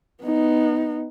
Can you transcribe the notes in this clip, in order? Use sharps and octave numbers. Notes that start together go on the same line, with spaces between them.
B3 D#4